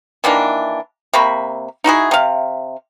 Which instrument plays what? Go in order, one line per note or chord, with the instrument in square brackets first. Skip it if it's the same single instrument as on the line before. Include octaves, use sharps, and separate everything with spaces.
[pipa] D#3 E3 A#3 D4
C3 A#3 B5 C#6
D#4 E4 F#4 G#4
C3 F5